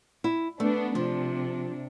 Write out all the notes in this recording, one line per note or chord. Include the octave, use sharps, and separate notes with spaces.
E4
A3 B3 D4
C3 F3 D4